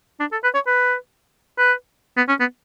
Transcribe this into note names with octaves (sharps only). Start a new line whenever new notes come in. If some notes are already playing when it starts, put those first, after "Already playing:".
D4
A4
B4
C#5
B4
B4
B3
C#4
B3